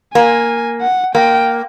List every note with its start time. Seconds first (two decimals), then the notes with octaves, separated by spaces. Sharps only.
0.15 A#3 G#5
0.81 F#5
1.15 A#3 G5